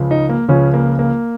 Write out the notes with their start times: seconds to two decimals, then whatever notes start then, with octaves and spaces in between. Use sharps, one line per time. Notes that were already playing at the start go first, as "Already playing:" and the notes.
Already playing: C#2 C#3 F3
0.11 D#4
0.29 A#3
0.48 C#2 C#3 F3 C#4
0.74 A#3
0.99 A#3